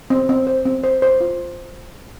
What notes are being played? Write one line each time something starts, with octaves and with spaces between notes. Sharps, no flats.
C4
C4
C5
C4
C5
C5
F4